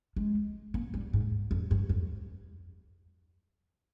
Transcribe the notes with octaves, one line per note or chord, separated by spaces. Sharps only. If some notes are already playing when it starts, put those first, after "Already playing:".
G#3
A#3
G3
G#2
F2
G2
F2